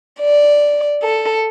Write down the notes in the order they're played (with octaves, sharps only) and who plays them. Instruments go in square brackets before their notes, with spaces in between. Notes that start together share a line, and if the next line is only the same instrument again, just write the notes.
[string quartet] D5
A4